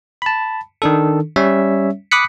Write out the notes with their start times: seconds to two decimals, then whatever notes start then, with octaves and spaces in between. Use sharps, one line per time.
0.22 A5 B5
0.82 D#3 D4 A4
1.36 G3 C#4 C#5 E5
2.11 B5 D6 D#6 F#6 B6 C#7